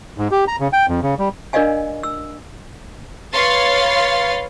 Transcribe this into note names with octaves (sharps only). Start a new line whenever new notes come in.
G#2
G4
A#5
C#3
G5
F2
C#3
G3
D4 A#4 D5 D#5 F5 G#5
E6
B4 C#5 F5 C6 A6